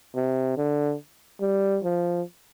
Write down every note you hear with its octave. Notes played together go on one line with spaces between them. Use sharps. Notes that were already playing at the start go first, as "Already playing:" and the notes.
C3
D3
G3
F3